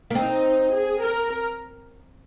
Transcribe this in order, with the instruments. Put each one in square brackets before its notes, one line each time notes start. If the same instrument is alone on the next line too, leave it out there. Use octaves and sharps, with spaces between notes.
[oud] A#3
[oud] C4 [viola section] D#4
[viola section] G#4
A#4